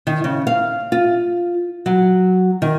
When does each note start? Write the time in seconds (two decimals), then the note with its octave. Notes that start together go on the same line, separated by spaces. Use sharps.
0.07 D#3
0.24 C#3
0.47 F5
0.92 F4
1.86 F#3
2.62 D#3